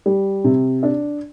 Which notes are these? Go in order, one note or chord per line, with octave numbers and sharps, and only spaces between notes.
G3
C3
D4